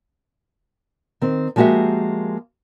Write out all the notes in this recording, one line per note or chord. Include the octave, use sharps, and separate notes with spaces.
D#3 C4
F3 G#3 A#3 F#4 G4 E5